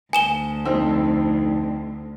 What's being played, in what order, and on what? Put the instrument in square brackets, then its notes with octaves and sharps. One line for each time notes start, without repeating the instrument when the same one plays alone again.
[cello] D2 [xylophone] G#5 E7 G7
[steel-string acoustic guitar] F2 D#4 [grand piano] C4 E6